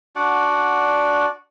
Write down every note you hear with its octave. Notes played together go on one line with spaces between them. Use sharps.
D4 F#4 D5 F#5